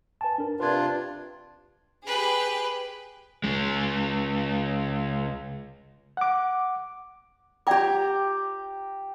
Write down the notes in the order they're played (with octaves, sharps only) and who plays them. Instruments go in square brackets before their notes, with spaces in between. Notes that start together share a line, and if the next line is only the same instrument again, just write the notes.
[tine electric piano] B4 G#5 A5
D4 A#4
[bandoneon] C3 D4 F4 [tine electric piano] B4 G#6
[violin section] G4 G#4 G5 [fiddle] B4
[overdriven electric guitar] C#2 G#3
[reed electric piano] F#5 D6
[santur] G4 A#5 [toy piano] D5 G5 D6